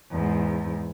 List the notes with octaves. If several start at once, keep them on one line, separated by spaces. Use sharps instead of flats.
E2 G#2